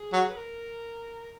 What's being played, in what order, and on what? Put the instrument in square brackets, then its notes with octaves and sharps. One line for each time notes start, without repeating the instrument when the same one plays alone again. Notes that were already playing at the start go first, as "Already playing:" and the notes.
Already playing: [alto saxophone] G#4
[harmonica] F#3
[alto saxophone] B4
A#4